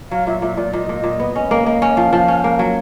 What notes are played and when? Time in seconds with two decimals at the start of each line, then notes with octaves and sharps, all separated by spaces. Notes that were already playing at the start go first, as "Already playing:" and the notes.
0.11 F#3 F5
0.27 A#2 E5
0.42 A#2 E5
0.57 A#2 D5
0.73 A#2 D#5
0.89 A#2
1.04 A#2
1.20 B3
1.36 C#4
1.51 A#3
1.66 A#3
1.82 C#4
1.97 F3 F5
2.13 F3
2.28 C#4
2.44 A#3
2.59 F#3